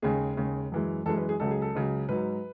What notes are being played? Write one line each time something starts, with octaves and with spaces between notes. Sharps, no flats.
D#2 C#3 G#3 G#4
D#2 C#3 G#3
F#2 E3 G#3
F#2 E3 G#3 A4
B4
G#4
C#2 C#3 F#3 A4
G#4
A4
C#2 C#3 F#3
G#2 F#3 B4